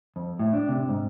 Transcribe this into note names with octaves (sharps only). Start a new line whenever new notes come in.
F2
A2
D4
C3
G#2